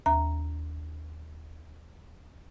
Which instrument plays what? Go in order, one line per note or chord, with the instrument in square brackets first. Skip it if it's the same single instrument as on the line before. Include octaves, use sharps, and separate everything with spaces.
[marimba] D#2 A#5